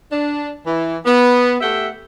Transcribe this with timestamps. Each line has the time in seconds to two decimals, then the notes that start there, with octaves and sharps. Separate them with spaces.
0.11 D4
0.66 E3
1.05 B3
1.61 A3 G4 E5 F#5 G5